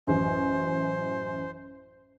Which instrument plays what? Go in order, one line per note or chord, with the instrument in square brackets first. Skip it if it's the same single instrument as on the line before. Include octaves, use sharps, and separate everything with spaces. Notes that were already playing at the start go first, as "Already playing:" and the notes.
[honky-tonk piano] A1 F#2 [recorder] C5